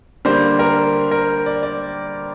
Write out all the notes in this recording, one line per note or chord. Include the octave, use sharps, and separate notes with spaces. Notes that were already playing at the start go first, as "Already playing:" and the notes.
D3 G3 A#3 C5
A#4
A#4
D5
D5